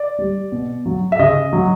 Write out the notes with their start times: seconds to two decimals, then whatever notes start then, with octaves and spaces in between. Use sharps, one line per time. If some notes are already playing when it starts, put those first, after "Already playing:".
Already playing: D5
0.19 G3
0.52 B2
0.86 F#3
1.12 E5
1.19 C#3 D#5
1.53 F#3